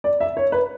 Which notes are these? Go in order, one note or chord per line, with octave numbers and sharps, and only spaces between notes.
D5
E5
C#5
B4